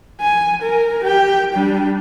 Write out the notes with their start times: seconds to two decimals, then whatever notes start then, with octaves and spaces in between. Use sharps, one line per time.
0.21 G#5
0.62 A#4
1.04 G4 G5
1.53 G3 D4